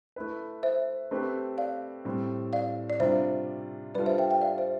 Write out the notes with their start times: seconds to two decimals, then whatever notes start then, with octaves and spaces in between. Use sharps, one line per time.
0.16 A3 E4 B4
0.63 C5 E5
1.11 A3 C4 G4 B4
1.58 D5 F5
2.05 A2 G3 C4
2.53 D5 F5
2.90 D5
3.00 C3 G3 D4 F4 C5 E5
3.95 G3 D4 F4 A4 B4 D5
4.06 C5 E5
4.18 E5 G5
4.30 E5 G5
4.42 D5 F5
4.58 C5 E5